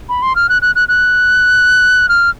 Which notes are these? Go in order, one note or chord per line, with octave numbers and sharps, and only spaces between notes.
B5
C6
F6
F#6
F#6
F#6
F#6
F6